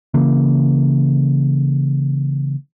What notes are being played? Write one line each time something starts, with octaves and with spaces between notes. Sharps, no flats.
C#3 E3 A#3